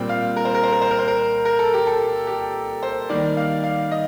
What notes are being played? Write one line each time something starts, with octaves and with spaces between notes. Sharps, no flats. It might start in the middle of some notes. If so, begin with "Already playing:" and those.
Already playing: A#2 G3 C4 G5
F5
A#4
C5
A#4
C5
A#4
C5
A#4
C5
A#4
A#4
A4
G4
A4
G4
C5
D#3 G3 A#3 D5
F5
F5
D#5